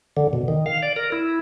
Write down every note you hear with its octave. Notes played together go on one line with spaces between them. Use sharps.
D3
B2
D#3
F5
D5
A#4
E4